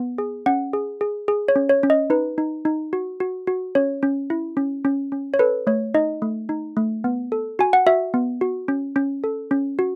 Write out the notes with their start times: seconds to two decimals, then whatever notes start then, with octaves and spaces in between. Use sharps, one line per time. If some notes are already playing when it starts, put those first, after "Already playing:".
Already playing: B3
0.18 G#4
0.46 C#4 F#5
0.73 G#4
1.01 G#4
1.28 G#4
1.48 C#5
1.56 C#4
1.69 C#5
1.83 C#4
1.90 D#5
2.10 D#4 B4
2.38 D#4
2.65 D#4
2.93 F#4
3.20 F#4
3.47 F#4
3.75 C#4 C#5
4.03 C#4
4.30 E4
4.57 C#4
4.85 C#4
5.12 C#4
5.34 C#5
5.39 A4 B4
5.67 A3 C#5
5.94 D#4 D#5
6.22 A3
6.49 D#4
6.77 A3
7.04 B3
7.32 A4
7.59 F#4 G#5
7.73 F#5
7.86 F#4 E5
8.14 B3
8.41 F#4
8.68 C#4
8.96 C#4
9.24 A4
9.51 C#4
9.79 F#4